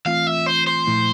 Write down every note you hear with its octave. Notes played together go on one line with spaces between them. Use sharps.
E3 A3 C4 F4 F5
E5
C5
C5
A#2 F3 A3 E4